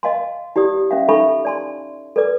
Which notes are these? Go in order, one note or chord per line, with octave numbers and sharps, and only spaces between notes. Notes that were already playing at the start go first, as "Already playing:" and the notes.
D#5 F5 A5 C6
E4 G4 D5 D#6
C#4 E5 F5
D#4 A4 E5 B5 C#6
D5 A5 C6
A4 B4 D5 D6